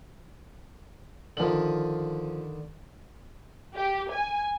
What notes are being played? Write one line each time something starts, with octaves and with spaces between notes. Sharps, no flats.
D3 D#3 F3 F#7
G4
G#5